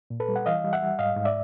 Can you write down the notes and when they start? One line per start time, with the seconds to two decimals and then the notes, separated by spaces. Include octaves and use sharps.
0.10 A#2
0.20 A4 B4
0.29 G3
0.36 F#5
0.46 E3 D#5 F5
0.65 G3
0.73 E5 F#5
0.82 G3
0.99 G#2 D#5 F5
1.16 G#2
1.25 D5 E5